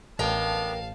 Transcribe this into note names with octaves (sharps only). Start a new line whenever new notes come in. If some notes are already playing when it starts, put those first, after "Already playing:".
A1 B3 D4 A#4 D#5 F5 G5 A5